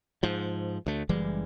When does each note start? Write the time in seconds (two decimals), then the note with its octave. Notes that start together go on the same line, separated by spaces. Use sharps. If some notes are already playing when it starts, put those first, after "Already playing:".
0.23 G#2 F3
0.86 D2 A3
1.09 F#1 E3 G3 G#3